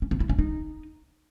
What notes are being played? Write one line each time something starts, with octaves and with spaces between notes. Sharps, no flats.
C#4
C4
E4
C#4
D#4